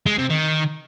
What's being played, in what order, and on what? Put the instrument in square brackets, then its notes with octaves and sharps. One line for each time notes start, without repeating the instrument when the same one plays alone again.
[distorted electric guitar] G#3
C3
D#3